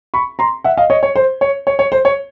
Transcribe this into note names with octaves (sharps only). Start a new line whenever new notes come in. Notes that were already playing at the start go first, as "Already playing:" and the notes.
B5 C#6
A#5 C6
E5 F#5
D#5 F5
C#5 D#5
C#5
C5
C#5
C#5
C#5
C5
C#5